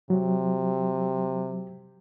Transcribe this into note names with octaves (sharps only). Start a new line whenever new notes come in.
C3 F#3